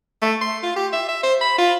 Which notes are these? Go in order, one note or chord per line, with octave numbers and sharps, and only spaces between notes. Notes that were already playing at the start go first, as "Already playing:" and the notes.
A3
C6
F4
G4
E5
E5
C5
B5
F4